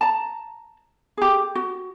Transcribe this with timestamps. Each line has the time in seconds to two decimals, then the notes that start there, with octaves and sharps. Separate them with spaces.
0.01 A5 A#5
1.17 G4 G#4
1.55 F#4